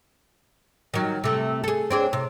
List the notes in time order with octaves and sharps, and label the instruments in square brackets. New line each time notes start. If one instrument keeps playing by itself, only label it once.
[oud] D#3 F#3
C3 A3
G#4 A4
C4 D4 G#4
C3